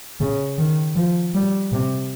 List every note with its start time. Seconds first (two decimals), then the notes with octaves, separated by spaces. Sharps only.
0.20 C#3
0.58 D#3
0.96 F3
1.34 G3
1.72 C3